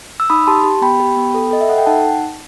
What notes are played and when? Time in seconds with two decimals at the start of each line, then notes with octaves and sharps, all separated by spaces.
0.20 E6
0.30 D#4 B5 D#6
0.47 G4 A5 C6
0.64 G4
0.81 B3 G5 B5
1.00 G4
1.17 B3
1.34 A4
1.51 A4 D#5
1.61 E5
1.69 A4 F#5
1.78 G5
1.86 D#4 F#5 A5